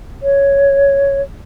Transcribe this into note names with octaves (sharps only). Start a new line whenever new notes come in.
C#5